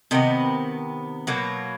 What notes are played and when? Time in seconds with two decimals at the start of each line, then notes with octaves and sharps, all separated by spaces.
0.11 C3 D#3 B3 D#5
1.27 B2 F#3 A#3